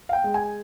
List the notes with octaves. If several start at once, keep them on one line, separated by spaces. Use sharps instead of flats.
F5
G5
G#3
G#5